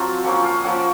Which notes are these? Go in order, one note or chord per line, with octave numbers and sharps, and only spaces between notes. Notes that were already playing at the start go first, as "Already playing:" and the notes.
Already playing: F#3 C4 F4 A5
F3 A#3 C#4 F#5
F5
F3 A#3 C#4 F#5